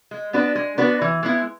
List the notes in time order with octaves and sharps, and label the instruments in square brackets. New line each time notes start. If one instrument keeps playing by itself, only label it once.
[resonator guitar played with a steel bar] G#3
B3 D4 F#4 B4
G#3
B3 D4 F#4 B4
E3
G#3 B3 E4